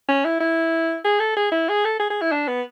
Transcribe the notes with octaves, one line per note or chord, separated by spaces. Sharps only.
C#4
E4
E4
G#4
A4
G#4
E4
G#4
A4
G#4
G#4
E4
D4
B3